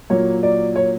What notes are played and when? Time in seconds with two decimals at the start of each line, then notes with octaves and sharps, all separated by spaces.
0.10 A#2 F#3 A#3 C#5
0.43 D5
0.76 C#5